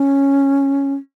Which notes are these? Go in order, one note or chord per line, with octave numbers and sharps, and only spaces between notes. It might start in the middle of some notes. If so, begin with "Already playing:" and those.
Already playing: C#4